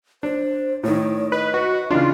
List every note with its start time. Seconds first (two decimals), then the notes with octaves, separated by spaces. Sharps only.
0.23 D4 C5
0.83 A2 D#3 C#5
1.32 B4 D#5
1.54 F#4 B4
1.90 C#3 E3 D4 F4